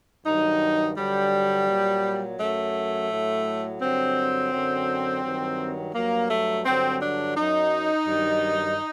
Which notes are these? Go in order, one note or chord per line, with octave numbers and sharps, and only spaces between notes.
G2 D#3 F#3 D#4
G2 D3 F#3 G3
A#2 F#3
F#2 F#3 A3
A2 F#3
G2 D3 F#3 C4
F#2 D3 F#3
G2 D#3 F#3
G2 F#3 A#3
A3
G2 D3 F#3 C4
D4
F#2 F#3 D#4
G2 D#3 F#3